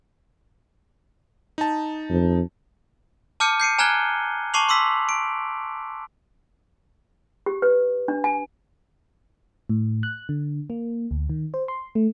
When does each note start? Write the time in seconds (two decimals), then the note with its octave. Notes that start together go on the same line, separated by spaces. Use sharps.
1.58 D#4 A5
2.10 F2
3.40 A5 D6 F6 G6 C#7 D#7
3.60 G6 C7 C#7 D#7
3.79 G#5 A#5 F6 F#6 G#6 G7
4.54 A5 C#6 D6 C7 F7 F#7
4.69 C6 D6 E6 B6
5.09 D7
7.46 G4
7.62 B4
8.08 D4
8.24 G#5
9.69 A2
10.03 F#6
10.29 D3
10.70 A#3
11.11 D2
11.30 D#3
11.54 C5
11.68 C6
11.95 A3